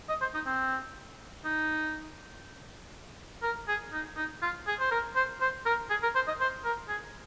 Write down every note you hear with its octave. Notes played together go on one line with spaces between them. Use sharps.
D#5
C5
D#4
C4
D#4
A#4
G#4
D#4
D#4
F4
G#4
C5
A#4
C5
C5
A#4
G#4
A#4
C5
D#5
C5
A#4
G#4